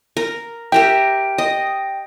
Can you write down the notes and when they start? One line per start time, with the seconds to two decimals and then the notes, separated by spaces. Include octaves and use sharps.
0.17 A#4
0.72 G4 A#4 E5 G5
1.38 D#5